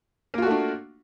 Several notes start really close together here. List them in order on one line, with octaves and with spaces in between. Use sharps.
A#3 F4 F#4 A3 D4